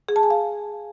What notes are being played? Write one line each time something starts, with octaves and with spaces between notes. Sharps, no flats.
G#4
A5
G#5
F5